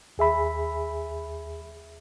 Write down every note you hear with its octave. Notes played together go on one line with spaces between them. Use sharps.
D#2 G#4 E5 B5